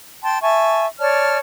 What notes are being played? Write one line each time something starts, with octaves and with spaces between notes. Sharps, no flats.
G5 A5 C6
E5 G#5 A5 C#6
C#5 D5 A5 F6